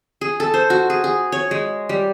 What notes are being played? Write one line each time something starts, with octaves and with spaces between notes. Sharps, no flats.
G#4
A4
C5
F#4
G#4
G#4
C#5
G#3
G3